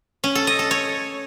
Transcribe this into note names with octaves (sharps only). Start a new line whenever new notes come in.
C#4
A4
D#5
A4
C#5